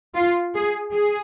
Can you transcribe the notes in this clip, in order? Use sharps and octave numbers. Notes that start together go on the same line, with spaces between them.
F4
G#4
G#4